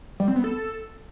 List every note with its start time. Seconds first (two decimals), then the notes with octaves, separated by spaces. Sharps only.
0.20 G3
0.28 C4
0.36 B3
0.44 A4